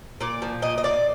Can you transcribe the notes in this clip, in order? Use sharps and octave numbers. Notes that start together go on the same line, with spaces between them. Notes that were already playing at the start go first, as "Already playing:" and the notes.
A#2 D5
F3
A#2 D#5
D#5
A#3 D5